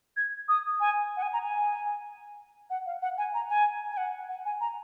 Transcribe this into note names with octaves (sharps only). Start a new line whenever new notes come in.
G#6
D#6
G#5
F#5
G#5
A#5
G#5
F#5
F5
F#5
G#5
A#5
G#5
G#5
F#5
F#5
G#5
A#5